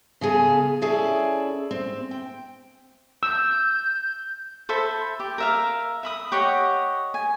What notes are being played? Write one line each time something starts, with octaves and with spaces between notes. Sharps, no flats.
C#3 B3 G#4 A4
C#4 E4 G#4 A4 D5
C4
G5
E6 G6
A4 C5 E5 B5
G4
A#4 E5 F5
E5 B5 D#6
G4 C#5 D#5 F#5
G#5